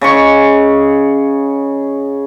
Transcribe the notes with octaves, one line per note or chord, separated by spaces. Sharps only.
C#3 D#5 C#6